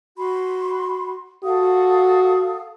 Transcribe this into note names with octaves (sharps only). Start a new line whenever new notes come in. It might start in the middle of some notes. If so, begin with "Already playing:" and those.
F#4 B5 C6
F#4 A4 F5 D#6